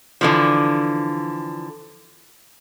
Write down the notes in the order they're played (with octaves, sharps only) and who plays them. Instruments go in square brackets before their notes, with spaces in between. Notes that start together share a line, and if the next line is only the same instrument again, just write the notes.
[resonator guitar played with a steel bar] D3 E3 F3